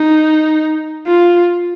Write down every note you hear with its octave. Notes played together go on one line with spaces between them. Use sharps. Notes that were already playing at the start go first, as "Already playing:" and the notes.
Already playing: D#4
F4